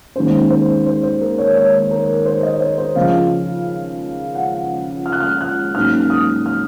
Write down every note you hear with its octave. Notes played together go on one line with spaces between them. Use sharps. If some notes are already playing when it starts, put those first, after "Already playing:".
D#2 D#3 G#3 C#4 C5
C5
C5
C5
A#4
C#5
C#5
A#4
C5
D#5
C#5
C5
C5
C#2 C#3 F3 F5
F#5
F6
F#6
F6
F#6
G#2 F#3 A#3 C#4 F6
D#6
F6